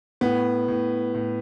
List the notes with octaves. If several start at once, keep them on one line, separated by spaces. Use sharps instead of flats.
A2 B3
A2
A2